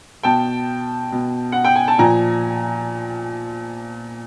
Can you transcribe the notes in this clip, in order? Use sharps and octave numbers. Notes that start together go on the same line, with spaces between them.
B2 G5 A5
B2
F#5
G5
G#5
A5
A#2 F3 G#5 A#5